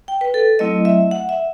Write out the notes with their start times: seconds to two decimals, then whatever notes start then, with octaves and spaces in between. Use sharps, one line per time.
0.08 G5
0.21 B4
0.34 A4
0.59 F#3 A3 C4 E4 D#5
0.85 E5
1.11 F#5
1.29 E5